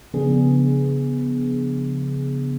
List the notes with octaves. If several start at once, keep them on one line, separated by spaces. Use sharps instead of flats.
C#3 F3 B3 D4 G#4